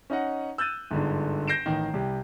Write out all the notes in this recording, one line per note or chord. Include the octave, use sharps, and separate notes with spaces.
C#4 D#4 D#5 F#5
E6 F#6 G6 A6 D#7
G1 G#2 D3
G6 A#6 C7 D7 E7
A1 D#3
C2 G4